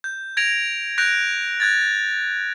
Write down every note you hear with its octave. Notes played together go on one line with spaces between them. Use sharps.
G6
G#6 A#6 D7 F7
F#6 G6 A#6 D7 F7
F#6 G#6 A6